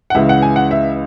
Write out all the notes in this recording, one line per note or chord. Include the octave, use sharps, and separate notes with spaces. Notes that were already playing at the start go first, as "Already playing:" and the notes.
F#5
C#2 C#3 E3 E5
F#5
G#5
F#5
E5